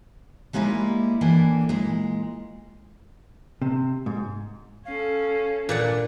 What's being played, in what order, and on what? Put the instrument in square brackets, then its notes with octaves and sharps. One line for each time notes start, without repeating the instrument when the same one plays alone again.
[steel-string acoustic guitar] G3 G#3 A#3 D#4 E4
A2 E3 A#3 D4
A#2 G#3
[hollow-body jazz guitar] C3
G#2
[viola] C#4 A4 [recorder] F5
[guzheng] A#2 D5 F#5 [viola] D4 [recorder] B4